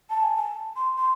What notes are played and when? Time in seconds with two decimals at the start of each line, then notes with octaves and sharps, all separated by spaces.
0.10 A5
0.23 G#5
0.36 A5
0.76 C6
0.97 C6